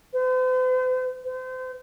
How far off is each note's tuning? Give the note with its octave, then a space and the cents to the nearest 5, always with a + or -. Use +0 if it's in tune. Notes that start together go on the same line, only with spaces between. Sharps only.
C5 -45
C5 -35